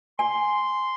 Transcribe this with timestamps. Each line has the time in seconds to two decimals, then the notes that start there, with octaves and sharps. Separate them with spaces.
0.19 G#5 C6